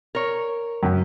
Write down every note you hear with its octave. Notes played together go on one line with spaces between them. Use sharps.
A#4 C#5
F#2